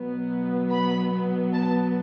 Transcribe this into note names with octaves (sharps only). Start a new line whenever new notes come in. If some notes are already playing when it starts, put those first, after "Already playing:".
Already playing: B2 F#3 B3
B5
A5